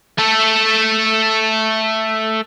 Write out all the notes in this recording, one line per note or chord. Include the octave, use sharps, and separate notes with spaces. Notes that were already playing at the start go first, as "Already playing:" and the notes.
A3 A4